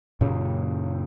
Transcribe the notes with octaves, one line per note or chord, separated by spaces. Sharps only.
F#2 A#2 C#3